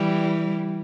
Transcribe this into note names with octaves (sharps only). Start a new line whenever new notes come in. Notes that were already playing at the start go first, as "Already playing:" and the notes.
Already playing: E3 G3